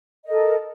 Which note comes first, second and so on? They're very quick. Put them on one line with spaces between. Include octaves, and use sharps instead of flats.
D#5 A#4 A4